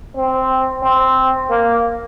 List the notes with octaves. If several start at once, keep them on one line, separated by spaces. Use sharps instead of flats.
C4
C4
A#3